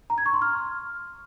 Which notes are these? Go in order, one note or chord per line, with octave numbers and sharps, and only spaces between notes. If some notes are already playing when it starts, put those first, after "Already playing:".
A#5
G#6
C#6
C6
F6